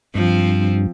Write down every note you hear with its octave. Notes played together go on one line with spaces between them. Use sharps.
G2 F3 C4